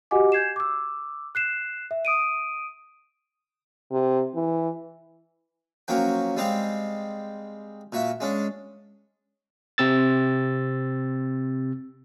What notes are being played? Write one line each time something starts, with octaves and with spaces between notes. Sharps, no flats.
F#4 G4 D#5 F#5 G#5 D6
G6 G#6 C7 E7
D6 E6
F#6 C7 E7
E5
D#6 D7 D#7
C3
E3
F3 F#3 A#3 C#4 F#4 G5
G3 G#3 C4 G4 F5
A#2 F#4 E5
G#3 C#4 D4
C3 C4 E6 A6